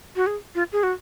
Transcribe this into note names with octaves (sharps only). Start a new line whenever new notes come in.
F#4
G#4
F4
G#4
F#4